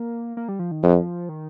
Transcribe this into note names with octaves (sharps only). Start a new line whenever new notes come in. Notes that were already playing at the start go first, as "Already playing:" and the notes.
Already playing: A#3
A#3
G3
F3
D#3
F2 F3
D#3